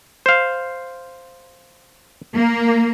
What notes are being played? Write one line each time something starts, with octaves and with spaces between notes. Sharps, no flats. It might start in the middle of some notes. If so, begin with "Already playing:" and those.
C5 F5
A#3